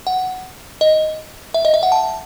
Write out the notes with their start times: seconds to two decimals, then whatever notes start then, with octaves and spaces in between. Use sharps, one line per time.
0.07 F#5
0.81 D#5
1.54 E5
1.65 D#5
1.74 E5
1.83 F#5
1.92 A5